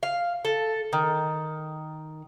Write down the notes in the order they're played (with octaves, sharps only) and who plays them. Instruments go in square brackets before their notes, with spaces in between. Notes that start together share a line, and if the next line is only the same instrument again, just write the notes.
[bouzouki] F5
A4
D#3